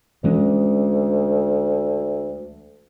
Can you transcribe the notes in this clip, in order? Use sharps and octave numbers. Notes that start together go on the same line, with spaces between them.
D2 E3 G#3 C#4